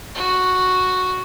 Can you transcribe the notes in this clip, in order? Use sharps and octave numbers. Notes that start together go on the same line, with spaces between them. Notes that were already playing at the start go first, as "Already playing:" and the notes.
F#4